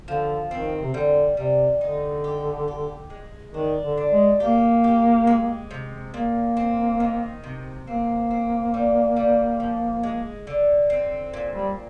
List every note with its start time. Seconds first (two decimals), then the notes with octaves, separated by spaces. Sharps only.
0.08 D3 F3
0.51 D#3 C4
0.82 C3
0.94 D3 G3
1.37 C3 G3
1.81 D3 D#4
2.24 G4
2.68 G4
3.10 G#3
3.54 D#3 D4
3.83 D3
3.97 D4
4.12 G#3
4.40 A#3 G4
4.84 G4
5.27 G#3
5.71 C3
6.14 A#2 A#3
6.57 C4
7.00 D#3
7.44 C3
7.86 A#3 C4
8.31 C4
8.74 G3
9.16 G3
9.60 F3
10.03 G#3
10.47 D3
10.90 C4
11.33 A#2
11.54 G3